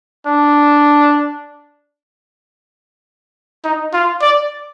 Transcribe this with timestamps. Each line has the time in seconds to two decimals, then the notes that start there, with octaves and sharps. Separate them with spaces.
0.27 D4
3.65 D#4
3.93 F4
4.22 D5